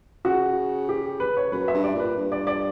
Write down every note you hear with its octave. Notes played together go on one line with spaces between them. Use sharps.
C#3 F#4
G4
B4
C#5
F#2 B4
E5
G2
D5
A#2 B4
G2
D5
D5